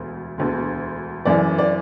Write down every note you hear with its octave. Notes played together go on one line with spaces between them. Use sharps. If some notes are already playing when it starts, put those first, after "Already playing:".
Already playing: E1 D2
E1 D2 D3
F#1 F#2 E3 D5
D5